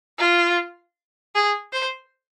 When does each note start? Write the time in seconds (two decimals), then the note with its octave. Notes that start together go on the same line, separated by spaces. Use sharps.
0.18 F4
1.35 G#4
1.73 C5